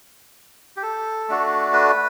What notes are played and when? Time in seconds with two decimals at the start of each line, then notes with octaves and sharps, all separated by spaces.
0.76 G4
0.83 A4
1.29 A3 D4 F#4
1.73 B4